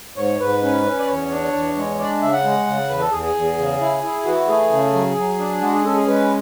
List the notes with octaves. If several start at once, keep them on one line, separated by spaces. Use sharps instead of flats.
G#2 C#5
G#2 B4
C#4
C#4
D5
E2 C#5
D4
E2
G#3
D4 D5
C#3 E5
F#5
G#3
C#3
E2 B4
A4
E2 G#4
G#4
E2
C#3
E4
E4
E3 F#4
A3 G#4
C#3
F#3
F#3
D4
G#3 F#4
G#4
C#4 A4
G#4
G#3 B4